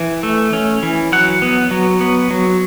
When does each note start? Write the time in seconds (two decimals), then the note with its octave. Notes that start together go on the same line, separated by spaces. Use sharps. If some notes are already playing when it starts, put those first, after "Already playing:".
Already playing: E3
0.23 A3
0.53 C#4
0.83 E3
1.12 F#3 F#5
1.42 B3
1.71 F#3
2.01 B3
2.31 F#3